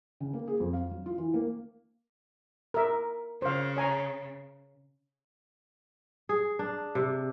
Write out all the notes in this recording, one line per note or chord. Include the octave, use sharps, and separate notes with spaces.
C#3
A#3
G#4
F2
F5
F#3
F4
E3
A#3
A#4 E5
C#3 C5 F5
C#5 G#5 A#5
G#4
D4
C3